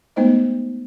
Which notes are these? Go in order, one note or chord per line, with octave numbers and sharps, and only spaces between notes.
G#3 A3 B3 D#4 C5 D#5